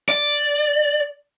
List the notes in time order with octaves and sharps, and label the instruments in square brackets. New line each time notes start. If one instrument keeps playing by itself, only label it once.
[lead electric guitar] D5